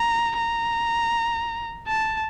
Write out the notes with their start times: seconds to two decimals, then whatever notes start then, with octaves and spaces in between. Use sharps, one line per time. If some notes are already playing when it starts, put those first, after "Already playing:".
Already playing: A#5
0.37 A#5
1.87 A5